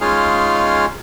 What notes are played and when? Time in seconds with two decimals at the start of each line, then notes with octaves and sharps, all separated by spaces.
0.01 G#3 C#4 D#4 F4 G#4 F5